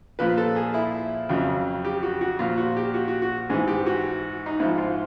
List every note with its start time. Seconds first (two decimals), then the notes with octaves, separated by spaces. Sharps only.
0.19 A#2 F3 B4
0.38 A4
0.56 G#4
0.74 E4
1.29 F2 C#3 F#3
1.85 G4
2.03 F#4
2.21 F#4
2.39 A#2 F3 F4
2.58 F#4
2.77 G4
2.94 F#4
3.08 F#4
3.22 F#4
3.50 G#2 E3 G#4
3.68 G4
3.86 F#4
4.46 D#4
4.60 G#2 F3 E4
4.78 F4